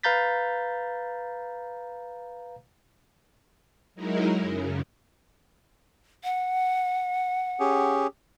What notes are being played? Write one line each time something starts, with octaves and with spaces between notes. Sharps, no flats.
B4 F5 A#5 G6 A6 B6
F#3 G#3 D#4 E4 A#4
F#2 C#3
F#5
C#4 G4 G#4